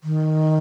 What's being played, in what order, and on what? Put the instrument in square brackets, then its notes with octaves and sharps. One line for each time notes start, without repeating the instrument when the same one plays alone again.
[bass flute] D#3